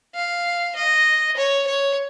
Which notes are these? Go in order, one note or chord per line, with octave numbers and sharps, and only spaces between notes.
F5
D#5
C#5
C#5